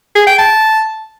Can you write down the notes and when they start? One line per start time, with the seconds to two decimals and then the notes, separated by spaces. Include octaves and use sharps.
0.15 G#4
0.27 G5
0.39 A5